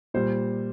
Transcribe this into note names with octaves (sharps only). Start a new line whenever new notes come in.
A#2 G3 C5